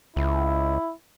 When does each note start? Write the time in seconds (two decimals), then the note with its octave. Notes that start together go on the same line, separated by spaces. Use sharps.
0.16 C#2 E4